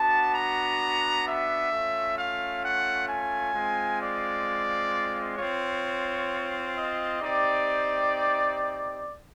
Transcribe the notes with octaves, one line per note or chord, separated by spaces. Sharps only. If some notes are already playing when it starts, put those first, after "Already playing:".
Already playing: B3 D4 F#4 A5
A#5
E5
A3 C#4 F4
F5
F#5
G#5
G#3 C4 F4
D5
C4 F4 C#5
D#5
C4 D#4 G4 D5